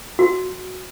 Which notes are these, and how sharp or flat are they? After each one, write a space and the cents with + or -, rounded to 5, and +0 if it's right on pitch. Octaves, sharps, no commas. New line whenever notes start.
F#4 -10